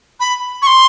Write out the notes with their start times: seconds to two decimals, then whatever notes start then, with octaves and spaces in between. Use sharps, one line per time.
0.20 B5
0.62 C#6
0.67 C6